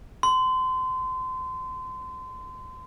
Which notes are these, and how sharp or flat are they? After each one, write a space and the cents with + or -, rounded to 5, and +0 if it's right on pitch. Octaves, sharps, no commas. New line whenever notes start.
C6 -30